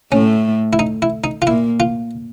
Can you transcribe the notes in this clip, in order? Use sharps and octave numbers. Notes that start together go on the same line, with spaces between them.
A2 A3 C#4
E4
D#4
E4
D#4
F4
A#2 A#3 E4
F4